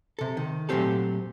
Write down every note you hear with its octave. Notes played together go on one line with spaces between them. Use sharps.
C3 A4
D#3
A#2 F#3 A3 C4 G4 A4